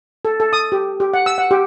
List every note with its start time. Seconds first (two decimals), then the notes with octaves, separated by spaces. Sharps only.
0.25 A4
0.40 A4
0.53 D#6
0.72 G4
1.00 G4
1.14 F#5
1.26 E6
1.38 F#5
1.51 G4